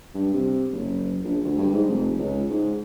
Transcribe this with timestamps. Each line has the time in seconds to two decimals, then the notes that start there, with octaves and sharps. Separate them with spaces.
0.14 G2
0.34 C3
0.72 F#1
1.24 A#1
1.44 D2
1.58 G2
1.73 G#2
1.88 F1
2.18 C#2
2.49 G#2